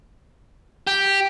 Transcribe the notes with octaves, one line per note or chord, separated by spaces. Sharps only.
G4